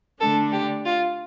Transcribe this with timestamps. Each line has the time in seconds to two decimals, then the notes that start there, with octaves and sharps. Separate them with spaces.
0.20 D3 A3 D4 A4
0.52 G4
0.85 F4